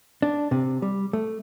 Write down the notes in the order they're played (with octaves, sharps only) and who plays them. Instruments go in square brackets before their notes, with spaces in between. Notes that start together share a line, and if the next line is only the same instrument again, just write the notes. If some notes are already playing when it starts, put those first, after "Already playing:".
[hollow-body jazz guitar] D4
C3
G3
A3